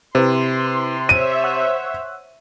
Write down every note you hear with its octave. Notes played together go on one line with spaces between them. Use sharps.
C3 E4 B4 C5 C6
C5 C#5 E5 D#7
F#5 E6 F#6